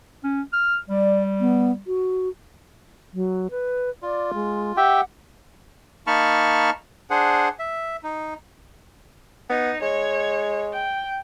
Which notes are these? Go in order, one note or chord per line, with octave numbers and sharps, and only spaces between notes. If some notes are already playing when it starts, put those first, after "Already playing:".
C#4
F6
G3 D5
B3
F#4
F#3
B4
F4 D5
G#3
G4 E5 F#5 G5
A#3 D#4 A5 B5 C#6 F6
D4 G#4 C5 F#5
E5
D#4
B3 D#4
G#3 C#5
G5